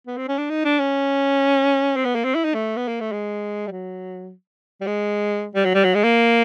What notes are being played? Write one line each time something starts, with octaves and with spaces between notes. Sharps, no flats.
B3
C4
C#4
D4
D#4
D4
C#4
C4
B3
A#3
C4
E4
D#4
A3
B3
A#3
A3
G#3
G3
F#3
G3
G#3
G3
F#3
G3
F#3
G#3
A#3